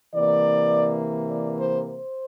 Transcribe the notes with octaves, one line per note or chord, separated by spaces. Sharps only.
C3 E3 A#3 D5
D5
C5
C5